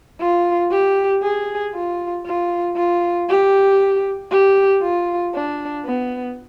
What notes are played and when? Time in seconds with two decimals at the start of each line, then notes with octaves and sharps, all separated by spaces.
0.20 F4
0.71 G4
1.23 G#4
1.74 F4
2.26 F4
2.76 F4
3.28 G4
4.31 G4
4.82 F4
5.34 D4
5.85 B3